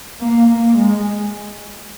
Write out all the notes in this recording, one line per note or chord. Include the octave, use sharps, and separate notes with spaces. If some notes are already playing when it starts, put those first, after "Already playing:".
A#3
A#3
G#3